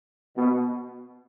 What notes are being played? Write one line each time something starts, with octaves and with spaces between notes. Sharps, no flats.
B2